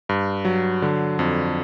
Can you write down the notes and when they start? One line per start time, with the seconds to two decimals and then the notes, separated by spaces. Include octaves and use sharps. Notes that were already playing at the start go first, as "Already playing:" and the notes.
0.09 G2
0.45 F#3
0.82 D3
1.19 F2